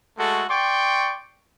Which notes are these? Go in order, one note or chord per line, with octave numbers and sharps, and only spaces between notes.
G#3 A3 F#4 A4
D5 G5 C6 C#6